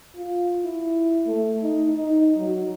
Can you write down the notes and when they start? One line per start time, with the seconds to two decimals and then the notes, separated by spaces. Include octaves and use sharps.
0.16 F4
0.64 E4
1.26 A3
1.62 D#4
1.96 D#4
2.37 F#3